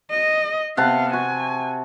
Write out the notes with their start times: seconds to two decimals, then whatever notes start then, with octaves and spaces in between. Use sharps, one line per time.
0.10 D#5
0.77 C3 B3 F5 F#5 A5
1.13 F#4 G#5